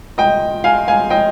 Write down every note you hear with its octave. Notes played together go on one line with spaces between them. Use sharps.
D#5 G5
F5 G#5
F5 G#5
D#5 G5